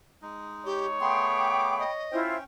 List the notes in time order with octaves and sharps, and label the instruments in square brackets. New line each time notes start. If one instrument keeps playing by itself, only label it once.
[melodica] G#3 D#4
[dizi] G4 [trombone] C#5
[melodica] A3 B3 G#4 [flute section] F5 G5 B5 [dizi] C6
[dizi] D6
D#5
[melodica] C#4 G5 [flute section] E4 F4 C5